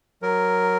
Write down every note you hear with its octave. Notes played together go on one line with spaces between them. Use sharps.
F#3 A#4